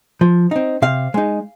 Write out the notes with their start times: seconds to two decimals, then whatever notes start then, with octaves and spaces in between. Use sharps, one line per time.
0.21 F3
0.51 C4 D#4
0.82 C3 F5
1.14 G#3 D#4